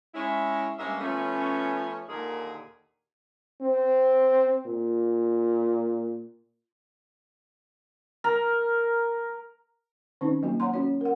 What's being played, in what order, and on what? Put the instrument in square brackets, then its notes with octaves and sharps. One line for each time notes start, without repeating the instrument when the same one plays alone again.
[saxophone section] G#3 C#4 E4
G2 G#3 A#3 C#4 E5
F3 A3 B3 C#4
D#2 A#2 D3 D#3 A#3 G#4
[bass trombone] C4
A#2
[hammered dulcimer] A#4
[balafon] D#3 C4 C#4 D#4
F#3 A#3 F#4
C#5 F#5 A#5 C6
C#4 F#4 C#5
A#4 F#5